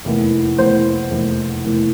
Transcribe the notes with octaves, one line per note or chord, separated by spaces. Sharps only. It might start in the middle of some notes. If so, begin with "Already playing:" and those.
F1 E2 E3 A#3
F1 E2 E3 A#3 C5
F1 E2 E3 A#3
F1 E2 E3 A#3